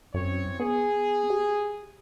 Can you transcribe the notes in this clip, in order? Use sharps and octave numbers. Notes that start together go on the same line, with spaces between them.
F#2 E3 C4 C#5
B3 G#4
G4